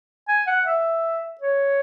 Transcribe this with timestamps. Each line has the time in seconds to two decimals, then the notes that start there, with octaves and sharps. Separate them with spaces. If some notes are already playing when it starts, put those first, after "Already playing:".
0.28 G#5
0.47 F#5
0.65 E5
1.41 C#5